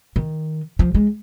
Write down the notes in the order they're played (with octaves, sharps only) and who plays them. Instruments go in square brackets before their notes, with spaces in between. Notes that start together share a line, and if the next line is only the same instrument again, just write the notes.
[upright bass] D#3
F3
G#3